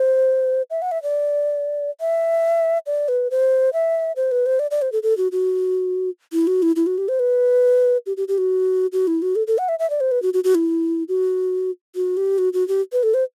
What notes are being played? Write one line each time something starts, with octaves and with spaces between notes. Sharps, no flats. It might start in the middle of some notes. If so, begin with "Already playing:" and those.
Already playing: C5
E5
F#5
E5
D5
E5
D5
B4
C5
E5
C5
B4
C5
D5
D5
C5
A4
A4
F#4
F#4
E4
F#4
E4
E4
F#4
G4
C5
B4
G4
G4
G4
F#4
F#4
E4
F#4
A4
A4
F#5
E5
E5
D5
C5
B4
F#4
F#4
F#4
E4
F#4
F#4
G4
F#4
F#4
G4
B4
A4
C5